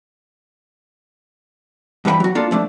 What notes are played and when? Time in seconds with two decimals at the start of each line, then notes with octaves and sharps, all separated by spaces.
2.05 G2 E3 B4 G5 B5
2.20 F#3 F#4
2.35 A#3 D4 F4 A4
2.51 F3 A3 D4